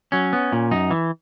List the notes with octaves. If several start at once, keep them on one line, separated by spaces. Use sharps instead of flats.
F#3 C#4
B3
A#2
F#2 D#4
E3